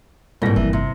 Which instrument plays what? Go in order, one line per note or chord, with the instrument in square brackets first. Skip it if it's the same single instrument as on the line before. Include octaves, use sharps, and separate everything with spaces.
[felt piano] C2 A#3 A#6 [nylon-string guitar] G#2 B2
[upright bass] G1 F3 [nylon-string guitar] E3
[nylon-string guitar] C3